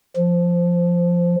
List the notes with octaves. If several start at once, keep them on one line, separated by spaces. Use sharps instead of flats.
F3